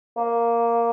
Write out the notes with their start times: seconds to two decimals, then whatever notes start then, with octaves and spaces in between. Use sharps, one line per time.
0.17 A#3